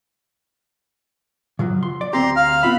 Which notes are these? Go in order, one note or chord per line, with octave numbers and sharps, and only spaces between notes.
C#3 F3 F#3
C6
D5
D2 C4 G4 A#5 C6
F5 F6
B3 F4 E5 B5